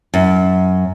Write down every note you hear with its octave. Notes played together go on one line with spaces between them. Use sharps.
F#2